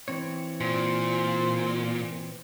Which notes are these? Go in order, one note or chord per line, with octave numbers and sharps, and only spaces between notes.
E3 C4 C#5
A#2 C5